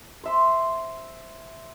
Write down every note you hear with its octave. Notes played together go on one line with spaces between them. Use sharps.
C5 E5 C6